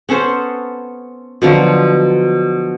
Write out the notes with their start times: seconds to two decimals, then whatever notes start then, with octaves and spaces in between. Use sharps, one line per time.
0.09 B3 C#4 A4 C5
1.42 B2 D3 F3 F#3